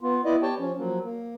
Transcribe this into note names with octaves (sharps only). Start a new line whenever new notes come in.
B3 F4
B3 E4 D5 D#5
G4 C#5 G5 A5
F3 C#4
F3 F#3 A#3
A#3